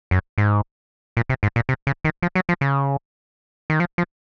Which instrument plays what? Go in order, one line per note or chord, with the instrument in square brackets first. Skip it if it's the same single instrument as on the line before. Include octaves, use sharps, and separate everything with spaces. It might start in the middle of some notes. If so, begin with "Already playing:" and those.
[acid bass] F#2
G#2
A#2
C3
G#2
A#2
C3
C#3
D#3
F3
F#3
F3
C#3
D#3
F3
F3